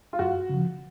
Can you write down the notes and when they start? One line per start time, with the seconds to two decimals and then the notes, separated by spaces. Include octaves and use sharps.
0.13 F4
0.19 F#2 F#4
0.49 C#3 F3